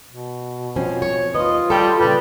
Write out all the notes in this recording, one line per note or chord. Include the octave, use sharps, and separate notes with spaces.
B2
F3 C4 C#4
C#5
D#2 F4 B4 D#5
G3 A4 G5
A#2 C#3 G3 B4